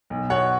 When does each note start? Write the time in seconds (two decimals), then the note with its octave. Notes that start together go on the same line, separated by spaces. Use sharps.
0.10 B1
0.30 B2 C#5 F#5